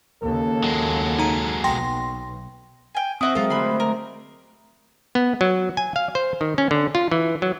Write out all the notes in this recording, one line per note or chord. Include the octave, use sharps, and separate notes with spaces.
D#2 C#3 A4
F#3 G#3
D#4 A#5 D#7
B1 G5 C6 A#6
G5 G#5
C4 E4 F#4 C5 E5 D#6
F#3 G#3 F4 A4 A#4
D2 A3 C5 B5 C6
A#4
B3
F#3
G#5
F5
C5
D#3
C#4
D3
F4
E3
F#3